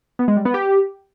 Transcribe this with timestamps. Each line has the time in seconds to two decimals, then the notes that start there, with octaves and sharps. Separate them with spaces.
0.19 B3
0.28 G#3
0.37 G3
0.45 B3
0.54 G4